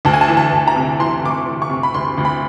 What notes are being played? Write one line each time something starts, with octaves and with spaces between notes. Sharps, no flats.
D2 A5
G#5
A5
E3
A5
D2
A#5
C3
E3 C6
D2 D6
C#6
E3
C#6
C3
B5
D2 C6
D2
B5